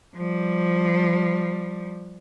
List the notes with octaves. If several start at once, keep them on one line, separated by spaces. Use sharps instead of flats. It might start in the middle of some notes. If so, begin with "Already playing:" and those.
F3 G3